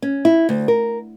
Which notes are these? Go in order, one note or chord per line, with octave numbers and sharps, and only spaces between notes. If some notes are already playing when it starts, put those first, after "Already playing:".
C#4
E4
D2
A#4